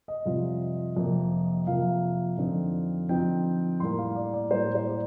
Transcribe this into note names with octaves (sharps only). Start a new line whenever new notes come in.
D#5
F2 C3 G3 C4 F4
F2 C3 F3 A#3
F2 C3 F3 A#3 F5
F2 D3 F3 C4 D#4
F2 D3 F3 C4 D#4 G5
A2 G3 A#3 C6
F5
D5
D5
A2 G3 A#3 C5
C5
D5